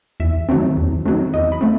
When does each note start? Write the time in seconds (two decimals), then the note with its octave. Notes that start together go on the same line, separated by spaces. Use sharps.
0.20 E2 E5
0.49 D#3 F#3 A3 C4
0.77 E2
1.06 D#3 F#3 A3 C4
1.34 E2 D#5
1.52 B5
1.61 A3 C4